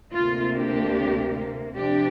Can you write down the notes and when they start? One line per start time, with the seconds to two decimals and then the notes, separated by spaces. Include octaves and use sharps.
0.13 D2 C3 A#3 F4
0.54 D4 G4
1.77 C3 F3 D4 G4